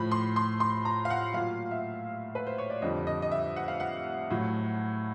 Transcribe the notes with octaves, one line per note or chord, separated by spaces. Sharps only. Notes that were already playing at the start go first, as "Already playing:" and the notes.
Already playing: A2 F3 B5
C6
C6
C6
A#5
F5
F#5
A#2 F#3 F5
E5
B4
C5
C#5
D5
F2 D3 G3 D#5
D#5
D#5
E5
F#5
F5
F#5
A2 F#3